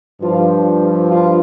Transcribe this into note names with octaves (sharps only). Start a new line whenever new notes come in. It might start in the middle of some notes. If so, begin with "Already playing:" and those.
G2 F3 F4
F4